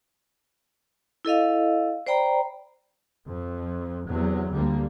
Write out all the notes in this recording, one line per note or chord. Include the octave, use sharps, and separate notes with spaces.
E4 A4 D#5 F5
C5 D5 G5 A#5 B5
F2
E2 C3 F#3
D2 D3 G3 A#3